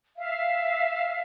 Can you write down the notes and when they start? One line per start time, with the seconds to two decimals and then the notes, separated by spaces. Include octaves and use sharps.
0.17 E5 F5